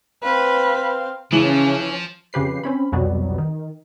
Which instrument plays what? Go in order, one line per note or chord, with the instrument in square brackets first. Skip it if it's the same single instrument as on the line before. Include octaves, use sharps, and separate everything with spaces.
[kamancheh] C4 F5 [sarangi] B4
[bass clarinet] C#3 [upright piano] E3 F#7 [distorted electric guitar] F3 [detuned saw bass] C#4
[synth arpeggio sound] F2 C#3 G4 B4 C7
C4 C#4 B5
C2 F2 B2 F#3 G3 B3
D#3